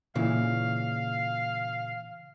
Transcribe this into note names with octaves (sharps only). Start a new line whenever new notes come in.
A#2 C#3 E3 F5